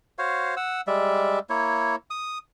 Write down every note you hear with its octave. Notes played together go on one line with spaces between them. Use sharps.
F#4 C5 C#5 F5
F#5 E6
G3 G#3 D5 E5
A#3 E4 C#5
D#6